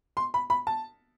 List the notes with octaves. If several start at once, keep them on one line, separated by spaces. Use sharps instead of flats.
C6
B5
B5
A5